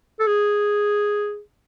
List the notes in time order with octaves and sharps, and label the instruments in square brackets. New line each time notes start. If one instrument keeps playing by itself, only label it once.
[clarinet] A4
G#4